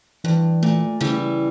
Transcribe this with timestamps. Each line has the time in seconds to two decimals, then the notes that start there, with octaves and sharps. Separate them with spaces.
0.24 G2 E3
0.63 A#2 A3
1.01 C#3 E3 G3